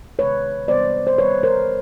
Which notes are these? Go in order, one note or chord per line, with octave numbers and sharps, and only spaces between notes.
C3 D#3 G#3 B4 C#5
C3 E3 G3 B3 C5 D5
C5
D#3 G3 B3 B4 C#5
A#4 C5